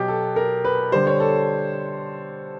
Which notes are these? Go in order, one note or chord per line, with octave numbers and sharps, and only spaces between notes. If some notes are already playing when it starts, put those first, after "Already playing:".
Already playing: B2 F#3 G4
A4
A#4
B4
D3 G3 C5
C#5
A4